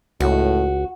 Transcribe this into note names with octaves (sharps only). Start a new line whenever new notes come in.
C#2 A2 F#4